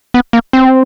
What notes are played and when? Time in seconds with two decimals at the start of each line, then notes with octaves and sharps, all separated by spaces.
0.14 B3
0.33 A#3
0.53 C4